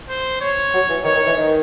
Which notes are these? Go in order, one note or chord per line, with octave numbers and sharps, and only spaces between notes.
C5
C#5
F#3
E3
D#3 C#5
D#3
E3
D#3